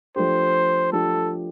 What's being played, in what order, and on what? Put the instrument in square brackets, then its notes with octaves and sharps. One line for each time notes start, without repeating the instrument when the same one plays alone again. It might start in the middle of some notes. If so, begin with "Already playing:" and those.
[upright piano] F3 A3 D4 G4 [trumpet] C5
[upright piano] F3 A3 D4 G4 [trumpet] A4